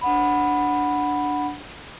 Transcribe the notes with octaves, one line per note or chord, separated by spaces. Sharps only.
D4 F#5 B5